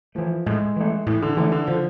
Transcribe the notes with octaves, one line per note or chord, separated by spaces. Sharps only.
E3 F3 A3
A2 G#3
E3 A3
A2 E3
D3
D3 E3 A3
D3
D3 F3